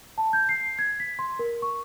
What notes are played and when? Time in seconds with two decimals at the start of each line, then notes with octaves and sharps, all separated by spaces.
0.18 A5
0.33 G6
0.49 C7
0.79 G#6
1.00 B6
1.19 C6
1.39 A#4
1.62 C#6